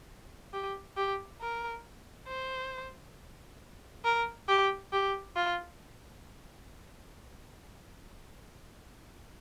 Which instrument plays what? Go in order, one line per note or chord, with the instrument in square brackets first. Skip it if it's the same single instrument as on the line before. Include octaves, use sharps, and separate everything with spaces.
[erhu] G4
G4
A#4
C5
A#4
G4
G4
F4